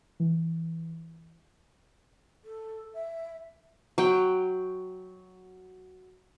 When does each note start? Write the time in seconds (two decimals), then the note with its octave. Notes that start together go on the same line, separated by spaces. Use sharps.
0.20 E3
2.45 A4
2.94 E5
3.98 F#3 G5